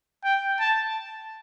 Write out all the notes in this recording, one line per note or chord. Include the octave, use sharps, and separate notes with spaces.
G5
A5